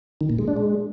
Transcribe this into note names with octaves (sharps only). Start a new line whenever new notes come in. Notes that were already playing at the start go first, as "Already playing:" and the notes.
D#3
A#2
G#3
D4
G#3